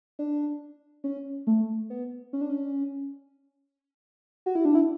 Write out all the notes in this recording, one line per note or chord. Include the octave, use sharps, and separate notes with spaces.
D4
C#4
A3
B3
C#4
D4
C#4
F#4
E4
D4
E4